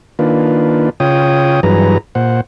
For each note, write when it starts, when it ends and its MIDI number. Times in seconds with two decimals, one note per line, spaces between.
0.19 0.90 51
0.19 0.90 58
0.19 0.90 62
0.19 0.90 65
0.19 0.90 71
1.00 1.60 49
1.00 1.60 65
1.00 1.60 73
1.00 1.60 79
1.00 1.60 87
1.63 1.98 43
1.63 1.98 52
1.63 1.98 54
1.63 1.98 68
1.63 1.98 71
1.63 1.98 82
2.15 2.41 46
2.15 2.41 72
2.15 2.41 78